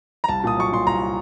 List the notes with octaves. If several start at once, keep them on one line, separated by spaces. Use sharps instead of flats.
A#5
C2 A5
A#2 D#6
F#3 C#6
A#2 C6
C2 A#5